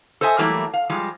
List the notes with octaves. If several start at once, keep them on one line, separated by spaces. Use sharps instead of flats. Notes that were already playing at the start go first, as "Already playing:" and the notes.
A4 C5 D#5 E5 G#5
E3 F#3 G3 A3 A#3 E4
F5
F3 G3 G#3